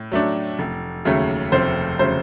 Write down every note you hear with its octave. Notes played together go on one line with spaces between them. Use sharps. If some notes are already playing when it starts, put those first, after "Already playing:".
Already playing: A2
F#3 A3 D4
F1
D#2 C#3 F#3 A3
F1 C5
C#3 F#3 A3 C5